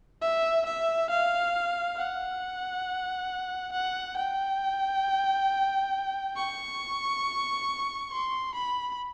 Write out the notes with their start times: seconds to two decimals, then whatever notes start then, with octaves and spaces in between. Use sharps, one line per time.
0.22 E5
0.66 E5
1.10 F5
1.97 F#5
3.72 F#5
4.17 G5
6.36 C#6
8.12 C6
8.55 B5